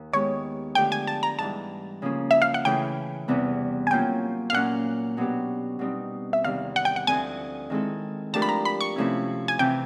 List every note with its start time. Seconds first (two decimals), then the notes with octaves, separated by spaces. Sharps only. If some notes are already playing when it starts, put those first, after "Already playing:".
Already playing: D#2
0.12 D#3 G#3 B3 D#4 G4 C#5
0.75 D3 F3 A3 D4 G4 G5
0.92 G#5
1.07 A5
1.23 A#5
1.39 G#2 E3 G3 A5
2.02 C#3 F3 A#3 C#4
2.31 E5
2.42 F5
2.54 F#5
2.65 C#3 E3 A3 G5
3.28 E2 C3 E3 G3 B3
3.87 G#5
3.91 F#3 A#3 C#4 F4 G5
4.50 F5
4.53 A#2 F#3 A#3 C#4 F#5
5.17 B2 F#3 B3 D4 G4
5.79 B2 G3 C4 D#4
6.33 E5
6.44 E2 C3 D#3 G3 F5
6.76 F#5
6.85 G5
6.96 F#5
7.07 D2 D3 F3 A3 C4 G#5
7.70 D#3 G#3 C4 E4 A4
8.33 F3 A3 D4 G4 A#4 A5
8.42 B5
8.49 A#5
8.65 B5
8.81 C#6
8.96 C3 F3 A3 C#4 E4
9.48 G#5
9.59 C3 E3 G5